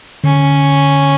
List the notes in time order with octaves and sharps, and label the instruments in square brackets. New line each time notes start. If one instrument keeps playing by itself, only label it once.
[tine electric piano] D3 [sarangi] C#4